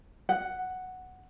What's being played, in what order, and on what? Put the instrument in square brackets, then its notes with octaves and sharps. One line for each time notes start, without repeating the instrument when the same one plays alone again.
[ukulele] F#5